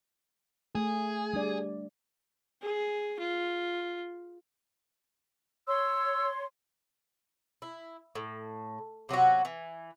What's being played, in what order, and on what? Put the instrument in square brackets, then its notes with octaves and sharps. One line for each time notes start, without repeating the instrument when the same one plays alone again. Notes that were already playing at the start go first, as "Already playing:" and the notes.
[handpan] A3 [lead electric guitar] G#4
[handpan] G3 D4 D5
[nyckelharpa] G#4
F4
[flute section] C#5 C6 [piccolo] E6
[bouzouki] E4
A2
C3 F#3 B3 F#4
E3